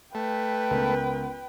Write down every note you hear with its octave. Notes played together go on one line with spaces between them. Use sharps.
A3 B4 G5
C#2 B3 A#4